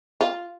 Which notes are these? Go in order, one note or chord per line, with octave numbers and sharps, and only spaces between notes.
F4